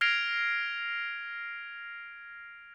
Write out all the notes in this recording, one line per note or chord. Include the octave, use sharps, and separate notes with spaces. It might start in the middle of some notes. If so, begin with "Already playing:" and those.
F6 G#6 A#6 C7 D7 F7